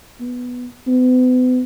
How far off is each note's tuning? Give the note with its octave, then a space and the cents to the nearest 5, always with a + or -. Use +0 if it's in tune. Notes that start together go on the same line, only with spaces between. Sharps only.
B3 -5
B3 +40